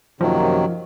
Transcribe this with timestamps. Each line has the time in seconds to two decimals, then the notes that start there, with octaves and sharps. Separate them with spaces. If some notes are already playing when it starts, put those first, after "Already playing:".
0.21 F#2 C3 D#3 F3 F#3 A#3